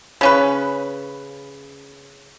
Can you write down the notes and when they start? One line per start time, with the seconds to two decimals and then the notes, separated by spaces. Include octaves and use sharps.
0.21 C#3 C#4 B4